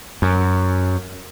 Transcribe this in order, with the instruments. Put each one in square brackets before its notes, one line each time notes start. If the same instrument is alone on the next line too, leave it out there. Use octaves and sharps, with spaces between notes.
[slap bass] F#2